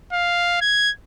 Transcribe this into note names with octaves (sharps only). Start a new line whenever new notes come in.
F5
G#6